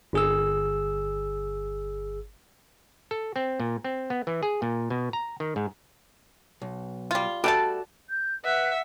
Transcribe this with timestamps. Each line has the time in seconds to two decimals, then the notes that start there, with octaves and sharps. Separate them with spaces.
0.13 G1 G#4 E6
3.11 A4
3.36 C4
3.60 A#2
3.84 C4
4.10 B3
4.27 E3
4.43 G#4
4.62 A#2
4.90 B2
5.13 A#5
5.40 D#3
5.56 G#2
6.62 B1
7.11 G3 F4
7.44 G3 A3 F#4 A4 D5 A5
8.10 G6
8.45 B4 E5 F#5